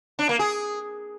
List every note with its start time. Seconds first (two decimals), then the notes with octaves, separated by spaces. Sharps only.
0.19 D4
0.29 A#3
0.39 G#4